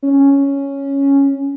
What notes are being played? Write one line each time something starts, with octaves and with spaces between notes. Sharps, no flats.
C#4